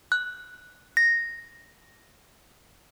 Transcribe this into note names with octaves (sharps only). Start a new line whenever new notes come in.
F#6
A#6